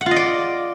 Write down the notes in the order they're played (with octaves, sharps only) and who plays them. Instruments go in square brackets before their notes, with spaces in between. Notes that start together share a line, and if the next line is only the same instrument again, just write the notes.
[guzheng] F#5
F4
D#5
D5